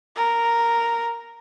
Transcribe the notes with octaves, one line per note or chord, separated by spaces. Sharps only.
A#4